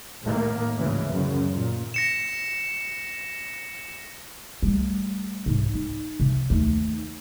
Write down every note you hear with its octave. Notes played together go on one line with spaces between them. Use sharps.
A2 D#3 A#3
D2 G#2 C#3 E3
F#2 C#3
A#2
A#6 C#7 E7
G3 A3
G#2 C3
D#4
C3
D#2 A3